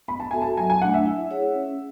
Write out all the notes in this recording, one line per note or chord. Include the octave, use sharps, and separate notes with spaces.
B3 B5
A5
F#4 A4 E5 G#5
A5
F#3 G#5
G#5
A3 D4 F#5
E5
E4
G#4 C#5 F#5
C#4